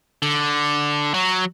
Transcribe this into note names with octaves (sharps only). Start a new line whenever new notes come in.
D3
F#3